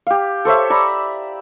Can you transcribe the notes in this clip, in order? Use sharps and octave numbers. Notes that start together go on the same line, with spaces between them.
G4 F5
A4 C5 C#5 E5
D5 A#5 B5